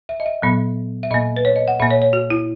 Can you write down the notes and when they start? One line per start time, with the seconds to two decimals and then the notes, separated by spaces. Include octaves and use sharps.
0.09 E5
0.20 D#5
0.26 E5
0.42 A#2 F#3 B3
1.03 E5
1.11 A#2 A#3 D#5
1.37 B4
1.45 C#5
1.56 D#5
1.68 F#5
1.80 A#2 A#3 E5
1.91 C#5
2.02 C#5
2.13 F#4
2.30 E4